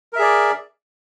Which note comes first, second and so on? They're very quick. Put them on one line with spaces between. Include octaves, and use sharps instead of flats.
A#4 E5 G#4 D5